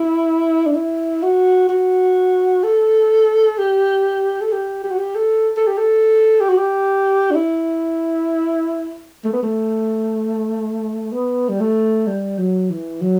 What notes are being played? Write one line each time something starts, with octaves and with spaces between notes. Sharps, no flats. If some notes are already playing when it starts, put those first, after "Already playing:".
Already playing: E4
D4
E4
F#4
F#4
A4
G4
A4
G4
G4
F#4
G4
A4
A4
G4
A4
G4
F#4
G4
D4
E4
A3
B3
A3
B3
G3
A3
G3
F#3
E3
F#3